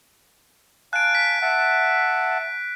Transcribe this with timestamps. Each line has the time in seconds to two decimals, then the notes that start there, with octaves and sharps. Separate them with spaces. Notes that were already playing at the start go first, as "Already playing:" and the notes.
0.93 F5 G#5 A5 F#6 D7
1.15 B6
1.42 E5 F#5 A5